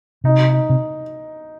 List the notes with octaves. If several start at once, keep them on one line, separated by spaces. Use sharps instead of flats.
C3 D#4
D#4
C3